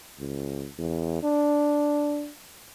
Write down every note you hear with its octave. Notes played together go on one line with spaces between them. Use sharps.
C#2
E2
D4